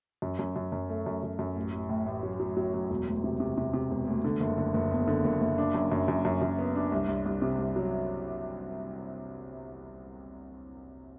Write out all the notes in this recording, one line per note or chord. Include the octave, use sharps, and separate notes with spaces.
F#2
F#2
F#2
F#2
A3
F#2
F#2
F#2
A1
A1
A2
A1
F#3
F#3
F#3
F#3
E1
D2
C3
C3
C3
C3
E1
D2
D3
F#1
D3
F#1
E2
D3
F#1
F#1
D4
F#2
F#2
F#2
F#2
F#2
B3
D4
C2
C2
C2
C3
C2
F#3